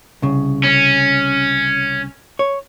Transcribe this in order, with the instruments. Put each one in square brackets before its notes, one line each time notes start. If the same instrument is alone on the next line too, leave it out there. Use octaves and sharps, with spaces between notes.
[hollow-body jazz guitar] C2 C#3
[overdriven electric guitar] C#4
[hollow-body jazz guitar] C#5